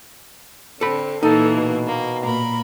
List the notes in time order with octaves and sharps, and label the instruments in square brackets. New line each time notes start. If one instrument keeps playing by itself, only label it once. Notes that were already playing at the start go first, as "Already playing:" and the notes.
[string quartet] D3 C4 [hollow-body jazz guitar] A4 B5
[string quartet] A#2 E3 A#3 [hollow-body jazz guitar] D#4 [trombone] A4
[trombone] B2
[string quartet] A#3
A#2 A#4 B5